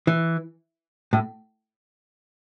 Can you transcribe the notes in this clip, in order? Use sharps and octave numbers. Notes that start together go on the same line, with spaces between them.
E3
A2